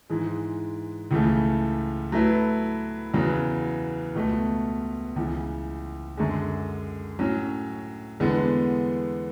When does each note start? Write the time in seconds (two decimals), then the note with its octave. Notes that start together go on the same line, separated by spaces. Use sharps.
0.10 G#2 E3 G#3
1.11 C#2 C#3 E3 A3
2.12 F#3 A3 E4 B4
3.14 E2 C#3 F#3 B3
4.15 C#2 B2 A3
5.16 C#2 C#3 E3
6.17 F#2 D3 G#3
7.19 A2 F#3 C#4
8.20 E2 D3 G#3 B3